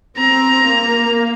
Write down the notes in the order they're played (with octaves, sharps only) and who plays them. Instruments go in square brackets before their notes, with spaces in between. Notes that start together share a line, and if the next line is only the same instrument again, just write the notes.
[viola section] C4 [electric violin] A#5
[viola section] A#3